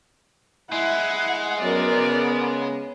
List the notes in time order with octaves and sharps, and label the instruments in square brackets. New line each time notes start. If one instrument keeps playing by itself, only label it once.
[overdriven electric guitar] G#3 [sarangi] E4 [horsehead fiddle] F#5
[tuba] F#2 [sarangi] B3 [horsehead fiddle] A#4 D5
[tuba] C#3